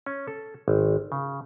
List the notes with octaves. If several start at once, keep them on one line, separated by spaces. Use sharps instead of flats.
C#4
A4
G#1
C#3